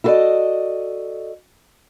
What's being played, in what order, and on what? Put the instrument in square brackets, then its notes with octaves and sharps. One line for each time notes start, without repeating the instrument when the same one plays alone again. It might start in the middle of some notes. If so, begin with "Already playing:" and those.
[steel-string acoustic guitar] E4 F#4 A4 B4 D5 D#5